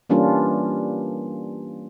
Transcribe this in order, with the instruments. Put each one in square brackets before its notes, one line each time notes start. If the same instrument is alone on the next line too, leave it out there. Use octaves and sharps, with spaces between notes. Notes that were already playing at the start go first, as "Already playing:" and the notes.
[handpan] E3 G3 A#3 C#4 D4 F4